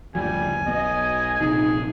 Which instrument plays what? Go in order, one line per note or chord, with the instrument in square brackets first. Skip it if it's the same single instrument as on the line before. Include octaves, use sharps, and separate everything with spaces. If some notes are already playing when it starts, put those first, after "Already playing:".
[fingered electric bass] F#1 D2 F3 [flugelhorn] G3 [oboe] G#5
[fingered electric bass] B1 B2 B3 [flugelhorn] D#5
[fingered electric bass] A#1 C3 [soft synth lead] D#4 [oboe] G#4